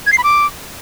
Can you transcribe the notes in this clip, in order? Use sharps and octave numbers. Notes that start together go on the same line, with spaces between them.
G#6
C7
B5
D6